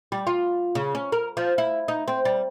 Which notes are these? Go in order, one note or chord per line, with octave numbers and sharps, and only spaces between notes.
G3
F4
C#3
C#4
A#4
F3
E4
D#4
C4
G3